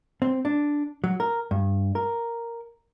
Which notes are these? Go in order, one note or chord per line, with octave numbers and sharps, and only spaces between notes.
C4
D4
F#3
A#4
G2
A#4